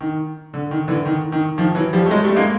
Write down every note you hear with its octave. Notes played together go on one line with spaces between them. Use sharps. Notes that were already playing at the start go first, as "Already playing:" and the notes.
D#3
D3
D#3
D3 E3
D#3
D#3
D#3 F3
E3 F#3
F3 G3
A3
F#3 G#3
G3 A3
G#3 A#3